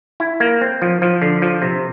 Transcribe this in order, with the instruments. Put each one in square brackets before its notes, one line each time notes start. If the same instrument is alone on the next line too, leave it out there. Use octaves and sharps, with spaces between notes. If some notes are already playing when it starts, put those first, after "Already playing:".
[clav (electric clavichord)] E4
A#3
C4
F3
F3
D3
F3
C3